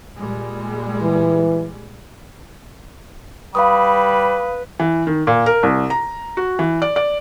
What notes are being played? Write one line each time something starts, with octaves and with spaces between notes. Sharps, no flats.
A#2 G3 G#3
E3
G3 B4 F5 B5 D#6
E3
D#3
A#2
A#4
C2
A#5
F#4
E3
D5
D5